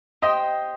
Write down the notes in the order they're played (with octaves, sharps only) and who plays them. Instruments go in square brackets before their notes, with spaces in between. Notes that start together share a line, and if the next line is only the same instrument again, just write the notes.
[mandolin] G4 C5 G5 [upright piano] D#5